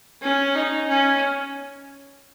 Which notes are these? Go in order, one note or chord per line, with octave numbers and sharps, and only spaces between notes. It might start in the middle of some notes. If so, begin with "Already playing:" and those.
C#4
D#4
C#4